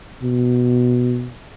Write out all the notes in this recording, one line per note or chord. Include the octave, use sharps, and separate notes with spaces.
B2